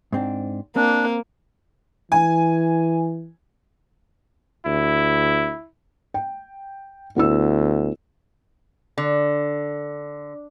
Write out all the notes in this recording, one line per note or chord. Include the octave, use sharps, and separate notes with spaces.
G#2 C4 D4
A#3 C4 D4
E3 G#5
D2 E4
G5
D2 B3 E4 E6
D3